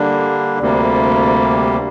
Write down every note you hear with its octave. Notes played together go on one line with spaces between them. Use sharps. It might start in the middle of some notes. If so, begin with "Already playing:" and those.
Already playing: D3 G3 A#3 D4
D2 C3 G3 A#3